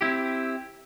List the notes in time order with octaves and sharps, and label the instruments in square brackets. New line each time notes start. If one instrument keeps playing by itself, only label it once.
[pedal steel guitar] C4 E4 G4